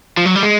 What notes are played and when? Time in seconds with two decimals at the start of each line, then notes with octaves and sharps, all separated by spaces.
0.17 F3
0.26 F#3
0.35 G3
0.43 G#3